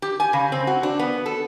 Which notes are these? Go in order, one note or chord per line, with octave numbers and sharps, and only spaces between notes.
G4
G#5
C#3
C4
F#4
D4
B3
A4